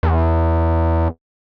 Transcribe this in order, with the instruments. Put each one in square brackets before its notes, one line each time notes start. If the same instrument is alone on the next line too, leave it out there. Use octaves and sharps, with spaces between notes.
[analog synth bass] E2